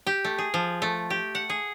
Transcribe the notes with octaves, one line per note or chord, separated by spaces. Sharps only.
G4
A3
G#4
F3
A3
G4
F#5
G#4